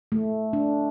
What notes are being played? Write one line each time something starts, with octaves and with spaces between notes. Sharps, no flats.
A3
D4